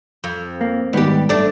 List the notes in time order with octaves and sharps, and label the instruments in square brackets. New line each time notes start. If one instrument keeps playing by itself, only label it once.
[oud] F2
[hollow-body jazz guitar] A#3
[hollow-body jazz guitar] G#2 D#3 B3 [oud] G3 G4
[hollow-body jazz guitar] G2 [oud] A3 D4